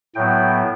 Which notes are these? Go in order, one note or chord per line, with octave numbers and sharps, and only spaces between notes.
A2 F#3 B3 G5